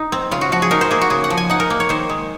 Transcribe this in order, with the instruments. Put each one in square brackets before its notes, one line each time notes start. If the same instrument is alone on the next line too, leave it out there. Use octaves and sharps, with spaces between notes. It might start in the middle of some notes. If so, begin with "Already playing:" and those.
Already playing: [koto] D#4
C4
C#3 F4
F#4
F3 F#4
G#4
D#4 A#4
C5
A#3 G#4
F#4
C#3 G#4
F#5
F3
G#5
D#4 F#5
A#4
A#3
C#5
D#3 C5
G#3